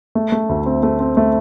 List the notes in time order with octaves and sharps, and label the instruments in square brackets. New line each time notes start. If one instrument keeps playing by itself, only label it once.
[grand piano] A3
A3
D2
C4
A3
C4
A3